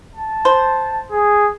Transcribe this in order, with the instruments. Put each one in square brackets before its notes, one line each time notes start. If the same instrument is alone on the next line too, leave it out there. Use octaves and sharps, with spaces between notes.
[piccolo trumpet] A5
[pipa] C5
[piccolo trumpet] G#4